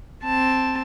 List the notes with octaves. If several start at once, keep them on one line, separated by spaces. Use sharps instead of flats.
C4 A5